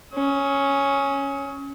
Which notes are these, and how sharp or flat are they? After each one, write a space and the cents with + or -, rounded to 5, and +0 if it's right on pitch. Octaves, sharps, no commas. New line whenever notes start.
C#4 +0 D#6 +40